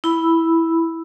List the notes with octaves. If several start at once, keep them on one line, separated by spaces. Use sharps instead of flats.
E4 B5 E6